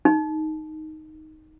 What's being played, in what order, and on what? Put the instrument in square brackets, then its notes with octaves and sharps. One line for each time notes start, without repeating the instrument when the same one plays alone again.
[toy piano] D#4